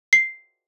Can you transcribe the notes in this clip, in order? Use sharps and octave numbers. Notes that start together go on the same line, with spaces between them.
C7